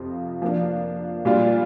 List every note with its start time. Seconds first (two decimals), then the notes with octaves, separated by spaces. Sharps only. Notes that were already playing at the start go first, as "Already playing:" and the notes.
Already playing: F2 C3 F3 F4
0.42 F3 A#3 D4
1.25 A#2 G3 D4 F4